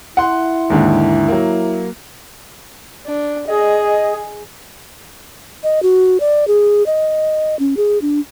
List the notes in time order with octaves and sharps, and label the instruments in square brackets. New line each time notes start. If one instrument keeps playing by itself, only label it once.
[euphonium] E4 [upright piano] F#5 C6
[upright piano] D#2 G#2 D3
F#3 A#3
[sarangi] D4
[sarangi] G#4 [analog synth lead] D#5
[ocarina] D#5
F#4
D5
G#4
D#5
C#4
G#4
D4